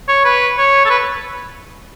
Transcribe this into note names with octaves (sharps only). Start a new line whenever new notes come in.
C#5
B4
C#5
A4
B4